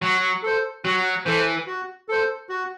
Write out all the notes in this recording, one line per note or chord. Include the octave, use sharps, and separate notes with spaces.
F#3 F#4
A4 C5
F#3 F#4
E3 A4 C5
F#4
A4 C5
F#4